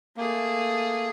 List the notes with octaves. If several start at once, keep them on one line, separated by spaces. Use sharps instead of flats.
A3 A#3 G#4